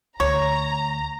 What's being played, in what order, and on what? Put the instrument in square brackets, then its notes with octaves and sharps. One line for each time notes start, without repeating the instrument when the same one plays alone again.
[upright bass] D2 [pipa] C#5 [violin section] A#5